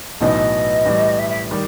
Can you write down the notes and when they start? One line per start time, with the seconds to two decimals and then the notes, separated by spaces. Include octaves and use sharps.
0.21 B1 A2 E3 B3 D#4 D#5
0.85 A2 E3 G3
1.19 E5
1.29 E5
1.51 D#3 G3